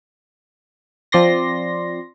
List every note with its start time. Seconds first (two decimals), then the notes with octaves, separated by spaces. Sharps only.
1.12 F3 C4 D5 C6 A#6